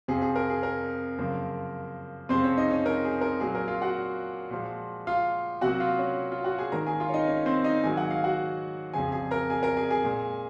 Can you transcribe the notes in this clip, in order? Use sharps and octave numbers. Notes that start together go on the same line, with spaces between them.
F2 C3 F3 G#4
G#4
A#4
G#4
A#4
F#2 C#3 F3 A#3
F2 C3 F3 G#3 C4 C5
C#4 C#5
D#4 D#5
C#4 C#5
A#4
G#4
A#4
A#2 F#3 A#3 G#4
A#4
F4 F5
F#4 F#5
A#2 F3 G#3
F4 F5
C3 F#3 A#3 F#4 F#5
F4 F5
C#4 C#5
F4 F5
F#4 F#5
G#4 G#5
G#2 D#3 A#3 A#4 A#5
G#4 G#5
F4 F5
C#5
D#4 D#5
C#4 C#5
C4 C5
D#4 D#5
G#2 D#3 F#3 A#3 G#5
F#5
F5
F#4 F#5
F2 C#3 F3 G#4 G#5
G#4 G#5
A#4 A#5
G#4 G#5
A#4 A#5
G#4 G#5
G#4 G#5
A#2 G#3